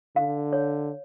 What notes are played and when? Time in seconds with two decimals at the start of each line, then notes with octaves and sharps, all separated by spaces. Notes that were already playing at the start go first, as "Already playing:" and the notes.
0.16 D3 F5
0.53 C#5